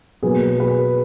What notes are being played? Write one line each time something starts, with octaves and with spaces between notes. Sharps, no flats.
B2 F#3 A#3 G#4 B4
G#4 B4